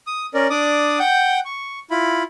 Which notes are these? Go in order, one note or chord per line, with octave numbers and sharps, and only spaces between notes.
D#6
C#4 A#4 D5
D4 D5 D6 D#6
F#5 G5 G6
C#6
E4 F4 B5